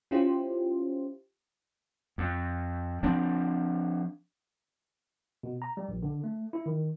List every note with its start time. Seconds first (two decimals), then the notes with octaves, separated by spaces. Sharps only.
0.11 C#4 E4 F4 G4 C5
2.18 F2
3.03 F3 C4 D4
5.43 B2
5.62 A#5
5.77 G3
5.89 A#1
6.03 D3
6.24 A3
6.53 E4
6.66 D#3